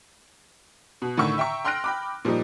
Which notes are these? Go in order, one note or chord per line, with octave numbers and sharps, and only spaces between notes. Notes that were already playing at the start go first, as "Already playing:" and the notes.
B2
A2 D3 D#3 C#6 E6
E5 G5 A#5 C#6
G5 C6 F6 F#6 A#6 D7
G5 B5 D6
A#2 F3 G3 D#4